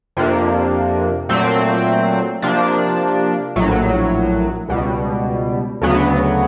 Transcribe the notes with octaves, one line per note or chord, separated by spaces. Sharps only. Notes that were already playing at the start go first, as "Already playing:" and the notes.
F2 C3 F3 A#3 D4
A#2 F#3 A3 C4
C3 F3 A#3 D4
A#1 A2 F#3
C#2 B2 G3
D2 C#3 F#3 B3